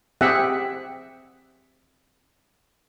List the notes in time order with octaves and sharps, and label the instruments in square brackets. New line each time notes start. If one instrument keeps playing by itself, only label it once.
[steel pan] C4 G4 G#4 E5 F#5